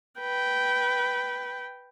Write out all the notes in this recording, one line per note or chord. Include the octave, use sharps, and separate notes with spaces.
B4 G5